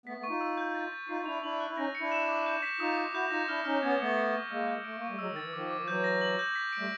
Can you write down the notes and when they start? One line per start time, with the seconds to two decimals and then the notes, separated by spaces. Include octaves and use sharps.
0.06 A3 B3 B6
0.17 A3 B3
0.23 C#6
0.29 D#4 F4
0.41 E6
0.57 G6
0.75 A6
0.92 A6
1.08 D#4 F4 C7
1.21 D#4
1.26 D4 E4 F7
1.43 D4 E4 F#7
1.60 F#6
1.69 E4
1.77 C#4 D#4 A#6
1.95 C#7
2.00 D4 E4
2.12 E7
2.29 D6
2.46 G6
2.62 B6
2.80 D#4 F4 D#6
2.97 D#6
3.13 E4 F#4 G6
3.31 D#4 F4 A#6
3.48 D4 E4 F6
3.65 C#4 D#4 F6
3.82 B3 C#4 G#6
4.00 A3 B3 C#7
4.17 B6
4.34 C#6
4.50 G#3 A#3 E6
4.68 G6
4.84 A3 D7
4.96 A#3
5.02 C#6
5.08 G3 A3
5.18 F#3 G#3 E6
5.31 D#3
5.36 A6
5.42 E3
5.53 D#3 F3 D6
5.71 D6
5.78 F3
5.87 E3 F#3 G6
6.04 A#6
6.21 F#7
6.39 G6
6.55 B6
6.73 D7
6.78 G3 A3